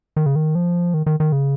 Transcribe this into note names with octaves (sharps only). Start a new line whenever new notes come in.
D#3
C#3
D#3
F3
D#3
D#3
D#3
C#3